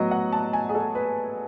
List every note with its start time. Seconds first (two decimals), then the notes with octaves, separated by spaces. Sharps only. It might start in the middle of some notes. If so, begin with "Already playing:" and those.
Already playing: A2 F#3 B3 F#4 D#5
0.11 F#5
0.33 A5
0.53 G#5
0.69 G#4
0.75 A4
0.95 B4